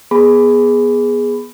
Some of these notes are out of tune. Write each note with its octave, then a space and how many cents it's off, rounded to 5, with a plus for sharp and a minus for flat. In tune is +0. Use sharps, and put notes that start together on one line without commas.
B3 -15 G#4 +0 B5 +10